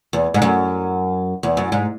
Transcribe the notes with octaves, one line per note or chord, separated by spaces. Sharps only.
E2
G#2
F#2
E2
F#2
G#2